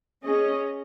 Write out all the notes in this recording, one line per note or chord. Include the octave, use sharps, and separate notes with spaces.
C#4 G#4 D#5